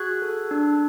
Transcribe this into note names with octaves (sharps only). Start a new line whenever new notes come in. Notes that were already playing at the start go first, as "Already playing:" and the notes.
Already playing: F#4 G#4 F#6 G#6
A4
D4